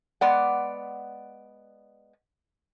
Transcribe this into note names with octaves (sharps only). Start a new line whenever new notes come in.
G#3 B3 D5 F#5